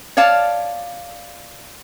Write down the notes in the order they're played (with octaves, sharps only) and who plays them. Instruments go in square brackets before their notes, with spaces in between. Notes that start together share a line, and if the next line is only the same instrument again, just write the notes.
[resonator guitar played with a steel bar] C#5 D5 F5 A5